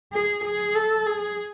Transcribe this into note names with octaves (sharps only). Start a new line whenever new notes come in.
G#4
G#4
A4
G#4